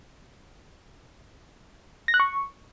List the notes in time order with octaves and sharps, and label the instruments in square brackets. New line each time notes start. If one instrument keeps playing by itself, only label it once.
[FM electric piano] A#6
F#6
C#6